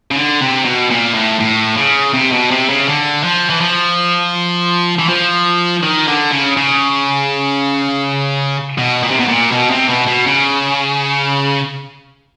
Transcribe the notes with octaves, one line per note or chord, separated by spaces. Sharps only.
C#3
D3
C3
B2
A#2
A2
A2
C#3
C3
B2
C3
C#3
D3
F3
E3
F3
E3
F3
D#3
D3
C#3
C#3
B2
A#2
C3
B2
A#2
B2
C3
B2
B2
C#3